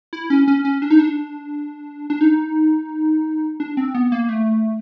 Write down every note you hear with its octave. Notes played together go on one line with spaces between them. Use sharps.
E4
C#4
C#4
C#4
D4
D#4
D4
D4
D#4
D4
C4
B3
A#3
A#3
A3